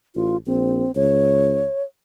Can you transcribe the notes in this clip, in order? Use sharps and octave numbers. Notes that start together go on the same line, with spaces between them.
A1 F4
A#1 C4
C#2 C#5